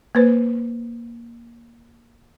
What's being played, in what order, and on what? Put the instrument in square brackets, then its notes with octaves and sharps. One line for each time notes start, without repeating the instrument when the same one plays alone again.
[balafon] A#3 B4 C5